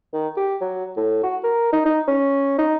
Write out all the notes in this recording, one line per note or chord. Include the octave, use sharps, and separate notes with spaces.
D#3
G4
F#3
A2
F#4
A#4
D#4
D#4
C#4
D#4